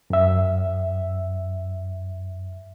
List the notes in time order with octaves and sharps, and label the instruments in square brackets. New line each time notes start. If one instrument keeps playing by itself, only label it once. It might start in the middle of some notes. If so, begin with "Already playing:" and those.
[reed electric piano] F#2 E5